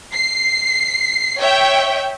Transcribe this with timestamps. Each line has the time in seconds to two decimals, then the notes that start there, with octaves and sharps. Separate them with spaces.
0.15 C7
1.41 C#5 E5 G5